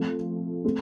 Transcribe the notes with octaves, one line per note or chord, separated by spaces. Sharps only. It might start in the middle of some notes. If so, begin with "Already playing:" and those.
Already playing: F3 A3 C4
A3 C4